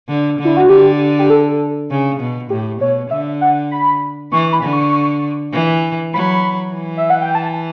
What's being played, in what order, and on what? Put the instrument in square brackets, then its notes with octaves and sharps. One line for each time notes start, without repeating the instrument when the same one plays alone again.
[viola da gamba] D3
D3
[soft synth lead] E4
F#4
[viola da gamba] D3 [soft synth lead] G4
[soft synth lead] G4
A4
[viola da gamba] C#3
B2
[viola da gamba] A2 [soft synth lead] G4
[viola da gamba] B2 [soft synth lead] C#5
[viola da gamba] D3 [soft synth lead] E5
[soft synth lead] F#5
B5
[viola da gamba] E3 [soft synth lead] C#6
[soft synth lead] B5
[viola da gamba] D3
[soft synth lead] C#6
[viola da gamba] E3
[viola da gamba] F#3 [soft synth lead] B5
[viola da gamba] E3
[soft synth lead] E5
F#5
G5
A5